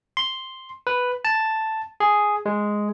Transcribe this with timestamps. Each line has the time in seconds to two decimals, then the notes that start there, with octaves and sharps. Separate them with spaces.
0.17 C6
0.87 B4
1.25 A5
2.00 G#4
2.46 G#3